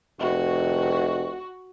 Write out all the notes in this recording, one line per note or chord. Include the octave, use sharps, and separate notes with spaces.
F1 F#4